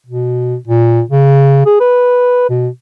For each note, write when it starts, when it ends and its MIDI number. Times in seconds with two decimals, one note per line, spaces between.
0.06 0.57 47
0.68 1.01 46
1.10 1.65 49
1.66 1.78 68
1.80 2.48 71
2.49 2.68 47